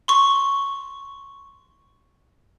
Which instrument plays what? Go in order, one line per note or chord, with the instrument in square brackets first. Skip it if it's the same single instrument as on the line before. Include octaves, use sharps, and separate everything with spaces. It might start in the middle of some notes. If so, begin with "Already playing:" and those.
[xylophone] C6 C#6